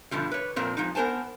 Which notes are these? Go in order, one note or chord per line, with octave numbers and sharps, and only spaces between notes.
G2 B2 D3 F3 G3
B4 C#5
F2 A#2 F3 C4 A#4
F3 G#3 D#4
B3 A#4 C5 G#5 A5